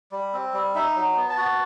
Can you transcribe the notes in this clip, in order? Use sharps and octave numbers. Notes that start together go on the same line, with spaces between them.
G3
C4
G3
D#4 E5
F#3
B3
A5
F#4